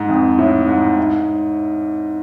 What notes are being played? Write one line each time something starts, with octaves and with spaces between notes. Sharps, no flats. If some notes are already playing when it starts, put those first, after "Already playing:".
Already playing: G#2
F2
A2
G#2
G#2